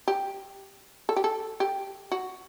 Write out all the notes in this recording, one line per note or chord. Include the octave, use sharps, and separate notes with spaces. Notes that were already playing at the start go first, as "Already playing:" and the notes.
G4
A4
G4
A4
G4
F#4